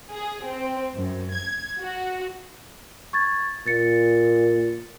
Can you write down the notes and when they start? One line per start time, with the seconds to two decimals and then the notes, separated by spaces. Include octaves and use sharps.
0.12 G#4
0.46 C4
0.94 F#2
1.34 G#6
1.79 F#4
3.13 C#6 G#6 A6
3.67 A#2 A6 C#7